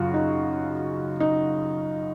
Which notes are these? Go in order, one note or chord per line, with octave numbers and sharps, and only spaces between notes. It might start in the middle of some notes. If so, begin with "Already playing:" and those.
Already playing: F#2 C#3 F4 F#4
D#4
D#4